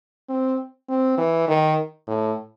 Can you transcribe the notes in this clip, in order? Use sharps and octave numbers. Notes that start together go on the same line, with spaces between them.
C4
C4
E3
D#3
A2